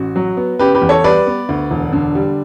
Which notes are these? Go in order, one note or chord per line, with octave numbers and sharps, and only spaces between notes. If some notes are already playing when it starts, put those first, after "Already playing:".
Already playing: A1 F#4
F#3
B3
C#3 G4 B4
G4 B4
E2
A4 C#5
G3 B4 D5
B3
D2
E1
D3
G3